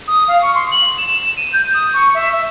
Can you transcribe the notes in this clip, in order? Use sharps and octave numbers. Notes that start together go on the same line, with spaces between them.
D#6
F5
C#6
C6
F#7
E7
D#7
G6
D#6
C#6
E5
E5